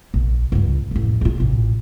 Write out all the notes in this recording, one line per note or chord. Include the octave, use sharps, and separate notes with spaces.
A#1
C#2 G2
A1 F2
A#1 F4
A1 A#2